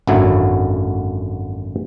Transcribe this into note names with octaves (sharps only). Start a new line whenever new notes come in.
G#1 F#2 D3 F#3 E4